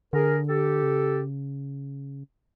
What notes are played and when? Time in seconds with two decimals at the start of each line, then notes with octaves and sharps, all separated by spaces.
0.13 D3 G#4 A#4
0.48 G4 A4
0.83 C#3